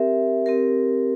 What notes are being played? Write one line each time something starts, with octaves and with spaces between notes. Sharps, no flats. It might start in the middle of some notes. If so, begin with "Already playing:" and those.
Already playing: C4 G4 A#4 E5
C4 G4 A#4